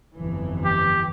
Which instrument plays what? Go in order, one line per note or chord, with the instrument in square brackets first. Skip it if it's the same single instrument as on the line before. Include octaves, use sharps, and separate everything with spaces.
[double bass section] G1 F2 E3
[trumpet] G4